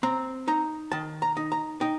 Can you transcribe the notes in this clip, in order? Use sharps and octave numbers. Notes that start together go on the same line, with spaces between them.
C4 A#5
D#4 A#5
D#3 A5
A#5
D#4
A#5
D#4 G5